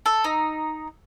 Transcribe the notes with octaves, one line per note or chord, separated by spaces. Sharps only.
A4
D#4